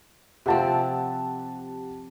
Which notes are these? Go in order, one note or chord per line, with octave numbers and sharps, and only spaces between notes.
C3 F3 C4 G4 F#5 A5